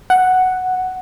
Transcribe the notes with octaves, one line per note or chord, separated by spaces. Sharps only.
F#5